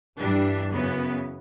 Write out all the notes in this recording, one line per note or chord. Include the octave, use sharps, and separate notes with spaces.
G2 E3 G3 D4
F#2 C#3 E3 B3